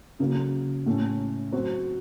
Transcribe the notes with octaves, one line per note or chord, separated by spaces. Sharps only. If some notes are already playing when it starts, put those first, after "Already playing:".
C#3 F#3 A#3
A2 A3 C#4
F#3 C4 F#4 C5